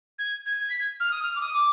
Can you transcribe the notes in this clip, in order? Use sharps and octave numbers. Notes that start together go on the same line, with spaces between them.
G#6
G#6
G#6
B6
G#6
F6
D#6
F6
D6
D#6
D6